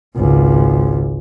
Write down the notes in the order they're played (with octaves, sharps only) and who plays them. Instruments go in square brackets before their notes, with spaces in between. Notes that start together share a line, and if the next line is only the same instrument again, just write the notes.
[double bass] G#1 C#2